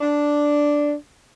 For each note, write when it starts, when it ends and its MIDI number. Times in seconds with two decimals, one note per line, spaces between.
0.01 0.93 62